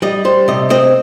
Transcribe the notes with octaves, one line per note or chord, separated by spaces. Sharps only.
G3 D#5
G3 C5
C3 D#5
C4 D#5